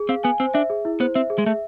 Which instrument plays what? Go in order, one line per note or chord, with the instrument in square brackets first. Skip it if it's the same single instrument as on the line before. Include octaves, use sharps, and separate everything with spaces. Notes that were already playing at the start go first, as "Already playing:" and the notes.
Already playing: [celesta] G#4
[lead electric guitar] C4 [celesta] F5
[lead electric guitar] B3 [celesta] G#5
[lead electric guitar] C4 [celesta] C5
[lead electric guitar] D4 [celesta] E5
[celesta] G#4
E4
[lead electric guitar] B3 [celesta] C5
[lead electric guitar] C4 [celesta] E5
[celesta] G#4
[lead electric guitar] G#3
[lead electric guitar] A3 [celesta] E5